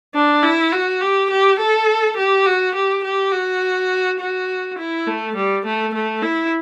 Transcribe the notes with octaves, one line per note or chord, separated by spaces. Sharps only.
D4
E4
F#4
G4
G4
A4
G4
F#4
G4
G4
F#4
F#4
E4
A3
G3
A3
A3
E4